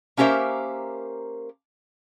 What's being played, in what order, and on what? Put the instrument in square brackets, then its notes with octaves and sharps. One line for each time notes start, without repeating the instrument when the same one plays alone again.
[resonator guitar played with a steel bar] A#3 C#4 G4 A#4 C5 E5